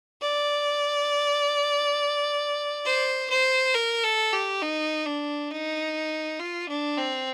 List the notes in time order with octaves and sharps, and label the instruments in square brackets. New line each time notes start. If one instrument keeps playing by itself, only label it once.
[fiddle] D5
C5
C5
A#4
A4
G4
D#4
D4
D#4
F4
D4
C4